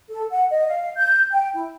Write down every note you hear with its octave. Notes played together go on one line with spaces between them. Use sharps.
A4
F#5
D#5
F5
G6
G5
E4